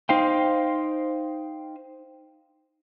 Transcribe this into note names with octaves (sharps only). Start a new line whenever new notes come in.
D#4 C5 F5 G5